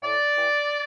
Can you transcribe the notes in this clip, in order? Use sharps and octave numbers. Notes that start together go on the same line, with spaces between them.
A2 D5
E3 G3